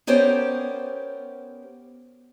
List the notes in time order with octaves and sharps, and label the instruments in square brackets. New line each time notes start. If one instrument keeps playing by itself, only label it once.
[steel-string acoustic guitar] B3 C#4 G4 A#4 C5 D5